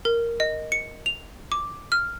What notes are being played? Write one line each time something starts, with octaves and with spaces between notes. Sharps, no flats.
A#4
D#5
C#7
F7
D6
F6